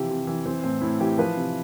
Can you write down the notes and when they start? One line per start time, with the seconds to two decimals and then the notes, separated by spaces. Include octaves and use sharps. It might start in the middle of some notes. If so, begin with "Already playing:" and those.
Already playing: C3 E3 F3 G4
0.10 C3
0.27 E3
0.46 E3 C4
0.64 A2 C4
0.81 A2 E4
1.00 E3 G4
1.18 F3 B4
1.37 C3